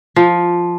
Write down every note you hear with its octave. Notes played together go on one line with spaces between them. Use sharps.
F3